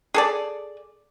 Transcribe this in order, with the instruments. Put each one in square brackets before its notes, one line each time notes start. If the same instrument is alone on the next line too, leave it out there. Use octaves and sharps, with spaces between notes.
[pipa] G#4 A4 D5